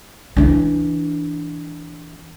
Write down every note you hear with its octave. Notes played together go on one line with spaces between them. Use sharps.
E3 D4